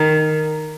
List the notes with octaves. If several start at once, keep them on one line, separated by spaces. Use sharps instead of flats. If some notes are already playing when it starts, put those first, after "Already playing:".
Already playing: D#3